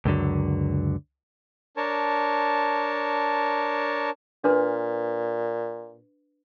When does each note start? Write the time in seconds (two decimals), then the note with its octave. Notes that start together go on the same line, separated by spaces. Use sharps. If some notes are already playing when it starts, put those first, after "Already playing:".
0.05 C#2 F#2 D3 F#3
1.77 D4 A#4 C#5 A5
4.44 A#2 D4 B4 C6